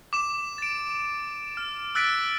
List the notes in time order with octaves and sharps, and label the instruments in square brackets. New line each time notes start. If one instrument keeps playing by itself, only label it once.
[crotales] D6 E7
A6 D7
F6
E6 F#6 A6 B6 D7